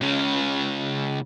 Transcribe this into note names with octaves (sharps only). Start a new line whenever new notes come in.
C#2 C#3